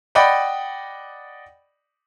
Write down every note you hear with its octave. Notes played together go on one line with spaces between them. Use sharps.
D5 D#5 F#5 G5 B5